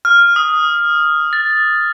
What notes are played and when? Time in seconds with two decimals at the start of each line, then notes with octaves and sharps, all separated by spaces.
0.05 F6
0.36 D#6
1.33 A6